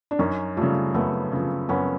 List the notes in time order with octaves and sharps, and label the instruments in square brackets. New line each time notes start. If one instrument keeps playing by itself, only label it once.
[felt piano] D4
F#2 C#4 D#4
C#3 F3 G3 A3
F#2 A3 B3
C#3 F3
F#2 B3 C#4